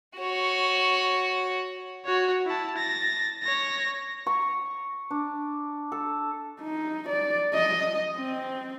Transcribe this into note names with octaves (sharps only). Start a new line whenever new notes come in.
F#4 C#5
F#4 C#5
E4 A5
A6 A#6
C#5 A#6
C#6
D4
A4
D#4
D5
D#5
C4